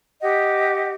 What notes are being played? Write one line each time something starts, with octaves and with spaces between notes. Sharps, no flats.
G4 D#5 F#5